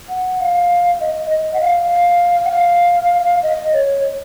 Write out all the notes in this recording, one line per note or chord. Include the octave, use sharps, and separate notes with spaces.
F#5
F5
D#5
D#5
F#5
F5
F5
F#5
F5
D#5
C#5